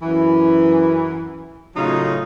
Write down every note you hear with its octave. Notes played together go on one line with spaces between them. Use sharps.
F#2 E3
A2 C#3 F#3 D#4 F4